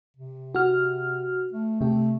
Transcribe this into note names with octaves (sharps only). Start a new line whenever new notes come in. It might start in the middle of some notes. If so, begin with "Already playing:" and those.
C3
F#4 F6
A3
C3 A3 G4